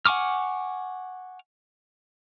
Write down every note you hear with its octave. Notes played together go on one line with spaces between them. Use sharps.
F#5 G#5 C#6 D6 F6